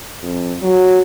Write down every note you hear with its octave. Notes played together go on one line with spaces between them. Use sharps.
F2
F#3